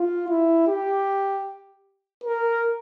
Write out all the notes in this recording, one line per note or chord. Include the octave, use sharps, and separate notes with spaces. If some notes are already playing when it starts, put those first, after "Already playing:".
Already playing: F4
E4
G4
A#4